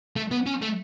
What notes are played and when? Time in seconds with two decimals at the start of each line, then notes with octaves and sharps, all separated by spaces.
0.16 A3
0.31 B3
0.46 C#4
0.62 A3